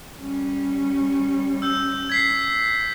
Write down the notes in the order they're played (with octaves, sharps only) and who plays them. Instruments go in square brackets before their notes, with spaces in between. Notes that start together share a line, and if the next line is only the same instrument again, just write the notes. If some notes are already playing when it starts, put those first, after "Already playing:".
[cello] G3 C#4
[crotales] E6 G6
G#6 B6 C7